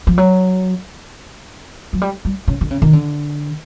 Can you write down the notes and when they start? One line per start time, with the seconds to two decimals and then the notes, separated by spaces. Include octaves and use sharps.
0.07 F3
0.18 F#3
1.93 F#3
2.02 G3
2.25 G3
2.48 C#3
2.61 D3
2.71 C#3
2.82 D#3
2.93 D3